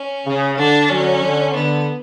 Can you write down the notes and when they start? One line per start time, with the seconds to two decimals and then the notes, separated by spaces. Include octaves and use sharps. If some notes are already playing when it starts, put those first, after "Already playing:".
Already playing: C#4
0.26 C#3
0.57 D3 D4
0.89 D3 F#3 C#4
1.22 D3
1.54 D3 B3